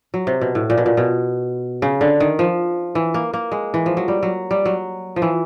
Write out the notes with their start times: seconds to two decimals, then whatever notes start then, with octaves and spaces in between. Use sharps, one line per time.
0.14 F#3
0.27 C3
0.41 B2
0.55 A2
0.70 A#2
0.78 B2
0.86 A#2
0.97 B2
1.82 C#3
2.01 D3
2.20 D#3
2.39 F3
2.95 E3
3.14 A#3
3.34 A#3
3.52 G#3
3.74 E3
3.86 F3
3.97 F#3
4.08 G3
4.23 F#3
4.51 G3
4.65 F#3
5.16 F3
5.22 E3